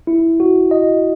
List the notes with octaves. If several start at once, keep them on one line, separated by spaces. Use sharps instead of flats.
E4
F#4
D#5